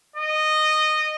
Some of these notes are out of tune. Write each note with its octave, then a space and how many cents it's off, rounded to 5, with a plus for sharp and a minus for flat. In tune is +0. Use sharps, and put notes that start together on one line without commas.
D#5 -15